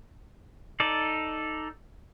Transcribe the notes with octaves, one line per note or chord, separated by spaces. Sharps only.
D#4 A4 D5